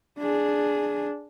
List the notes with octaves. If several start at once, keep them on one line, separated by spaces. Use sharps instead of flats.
D4 G#4